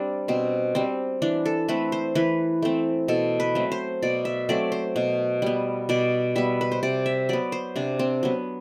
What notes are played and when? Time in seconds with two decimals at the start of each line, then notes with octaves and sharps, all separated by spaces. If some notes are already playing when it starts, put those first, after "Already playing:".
Already playing: G3 C4 D4
0.28 B2 C4
0.75 G3 C4
1.22 E3 D4
1.46 A4
1.68 A3 C4 B4
1.92 C5
2.15 E3 B4
2.62 A3 C4
3.08 B2 A4
3.40 B4
3.55 F#3 A3 C4
3.72 C5
4.03 B2 D5
4.25 E5
4.49 F#3 A3 C4 D5
4.72 C5
4.96 B2
5.42 G3 B3
5.89 B2 D5
6.36 G3 B3 E5
6.61 B4
6.72 C5
6.83 C3 D5
7.06 E5
7.29 F#3 B3 D5
7.52 C5
7.76 C3 D4
7.99 C4
8.23 F#3 B3